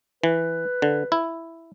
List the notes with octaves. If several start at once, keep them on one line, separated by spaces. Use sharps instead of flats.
E3 B4
D3
E4